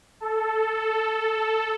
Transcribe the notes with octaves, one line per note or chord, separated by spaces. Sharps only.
A4
A4